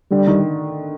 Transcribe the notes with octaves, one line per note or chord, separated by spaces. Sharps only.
D3 G3
D#3